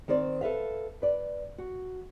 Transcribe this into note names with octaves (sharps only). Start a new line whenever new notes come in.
D#3 C4 C5 D5
A4 B4 E5 F5
B4 D5
F#4